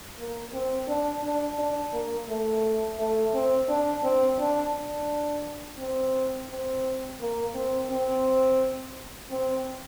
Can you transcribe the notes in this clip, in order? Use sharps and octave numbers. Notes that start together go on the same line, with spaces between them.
A#3
C4
D4
D4
D4
A#3
A3
A3
C4
D4
C4
D4
D4
C4
C4
A#3
C4
C4
C4